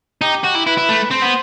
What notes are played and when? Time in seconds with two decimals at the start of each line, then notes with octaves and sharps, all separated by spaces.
0.22 D#4 G4
0.44 F#4
0.55 E4
0.66 E4 B4
0.77 E4
0.89 A3
1.11 C4 C5
1.22 B3